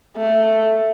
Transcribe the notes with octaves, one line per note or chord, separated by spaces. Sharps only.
A3